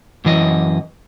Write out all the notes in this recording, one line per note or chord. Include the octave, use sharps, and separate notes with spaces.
F#2 E3 D#5